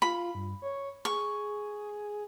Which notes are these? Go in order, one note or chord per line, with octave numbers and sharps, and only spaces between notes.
F4 B5
G2
C#5
G#4 C#6